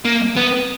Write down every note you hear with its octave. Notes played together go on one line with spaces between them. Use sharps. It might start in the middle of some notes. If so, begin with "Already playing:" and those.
A#3
B3